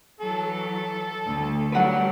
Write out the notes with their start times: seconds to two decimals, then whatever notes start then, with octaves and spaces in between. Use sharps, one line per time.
0.20 E3 F#3 A4
1.26 D2
1.72 F#3 G3 B4 F#5